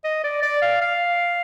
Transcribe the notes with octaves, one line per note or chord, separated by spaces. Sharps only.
D#5
D5
D5
F5
F5